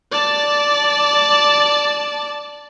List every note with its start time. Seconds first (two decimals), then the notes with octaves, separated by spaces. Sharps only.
0.12 D5 A5